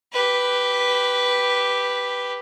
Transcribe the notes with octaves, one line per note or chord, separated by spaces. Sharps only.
G4 B4